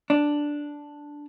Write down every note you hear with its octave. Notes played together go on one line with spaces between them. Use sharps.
D4